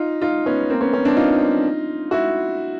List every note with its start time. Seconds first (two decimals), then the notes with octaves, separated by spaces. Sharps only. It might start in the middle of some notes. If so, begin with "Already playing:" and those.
Already playing: D#4 F4
0.22 D#4 F4
0.46 B3 C#4
0.70 A#3 C4
0.81 B3 C#4
0.93 B3 C#4
1.05 C4 D4
1.16 D#4 F4
2.11 E4 F#4